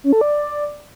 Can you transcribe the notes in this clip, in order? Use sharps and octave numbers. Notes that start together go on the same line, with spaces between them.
C#4
A4
D5